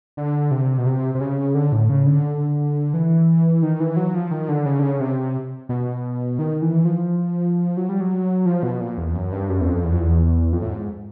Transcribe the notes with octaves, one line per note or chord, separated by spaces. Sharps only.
D3
C3
B2
C3
C3
C#3
D3
A2
C#3
D3
E3
D#3
E3
F#3
F3
D#3
D3
C#3
D3
C#3
C3
B2
D#3
E3
F3
F#3
G3
F#3
F3
B2
A#2
E2
F#2
G2
F#2
E2
F2
E2
F2
E2
F2
A2
G#2